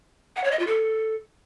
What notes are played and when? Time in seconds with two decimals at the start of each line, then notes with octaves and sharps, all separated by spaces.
0.36 F#5
0.44 C#5
0.51 D#5
0.59 F4
0.67 A4